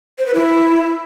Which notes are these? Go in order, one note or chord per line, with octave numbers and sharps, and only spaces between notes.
C5
B4
E4